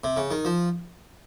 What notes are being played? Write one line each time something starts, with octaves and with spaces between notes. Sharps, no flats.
C3
C#3
D#3
F3